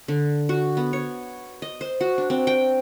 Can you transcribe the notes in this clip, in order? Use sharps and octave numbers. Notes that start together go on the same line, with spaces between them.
D3
F#4
B3
C#5
D#5
C5
F#4
D4
C4
G5